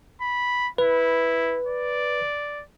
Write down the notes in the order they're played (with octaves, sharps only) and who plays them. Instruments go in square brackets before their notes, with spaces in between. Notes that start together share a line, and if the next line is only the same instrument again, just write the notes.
[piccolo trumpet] B5
[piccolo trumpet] E4 [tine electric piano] B4
[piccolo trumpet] D5